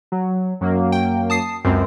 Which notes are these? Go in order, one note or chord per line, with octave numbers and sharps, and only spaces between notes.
F#3
F#2 F#3 A#3
G5
A5 D#6 C7
C#2 F#2 C4